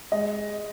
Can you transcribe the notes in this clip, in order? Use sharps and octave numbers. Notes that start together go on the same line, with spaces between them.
G#3 D#5